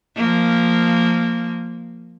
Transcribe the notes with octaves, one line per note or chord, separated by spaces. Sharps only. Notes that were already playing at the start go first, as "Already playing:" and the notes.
F3 A#3